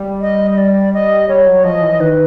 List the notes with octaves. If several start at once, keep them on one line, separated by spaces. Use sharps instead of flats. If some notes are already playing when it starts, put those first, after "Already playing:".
Already playing: G3
D#5
D#5
D5
D#5
G3 C#5
F#3
F3 D#5
E3
D#3 B4